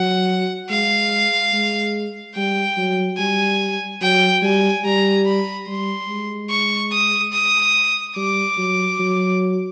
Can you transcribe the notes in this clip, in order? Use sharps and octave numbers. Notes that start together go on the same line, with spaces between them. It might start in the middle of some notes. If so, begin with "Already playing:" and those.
Already playing: F#3 F#5
G#3 F5
G#3
G3 G5
F#3
G3 G#5
F#3 G5
G3 G#5
G3 A#5
B5
G3 C6
G#3
C#6
D#6
D#6
G3 D6
F#3
F#3